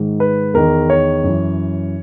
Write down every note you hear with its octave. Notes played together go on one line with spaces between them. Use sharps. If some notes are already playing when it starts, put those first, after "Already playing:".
Already playing: G#2 D#3
B4
E2 D#3 A#4
C#5
F#2 E3